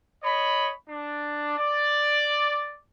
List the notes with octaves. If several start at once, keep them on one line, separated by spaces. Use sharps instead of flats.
C#5 D#5 B5
D4
D5